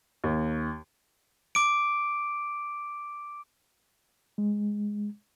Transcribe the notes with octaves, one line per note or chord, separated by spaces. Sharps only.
D#2
D6 D7
G#3